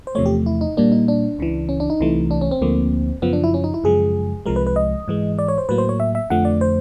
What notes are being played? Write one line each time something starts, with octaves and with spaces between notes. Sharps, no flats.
C5
E2 C3 F3 A3 C#5
G4
E4
D#4
A#2 G3 A#3 D4
D#4
D4
C#2 C#3 E3
C#4
D4
D#4
C2 C3 E3 A3
D4
C#4
C4
D2 D3 F3 A#3
F#2 C#3 F3 B3
D4
E4
C#4
D#4
E4
F#2 C#3 F3 G#3 G#4
C2 C3 F3 G#3 A#4
B4
B4
D#5
G#2 E3 G#3
D5
C#5
C5
A2 F#3 A#3 B4
C5
C#5
E5
E5
F2 D3 F3 A3 F#5
D5
C5